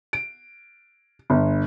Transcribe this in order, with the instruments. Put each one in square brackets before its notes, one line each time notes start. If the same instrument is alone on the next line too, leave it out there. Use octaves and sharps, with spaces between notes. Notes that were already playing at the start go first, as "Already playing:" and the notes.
[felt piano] D7
G1